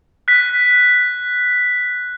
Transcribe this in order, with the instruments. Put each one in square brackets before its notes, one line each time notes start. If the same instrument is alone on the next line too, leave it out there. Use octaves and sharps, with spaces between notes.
[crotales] F#6 B6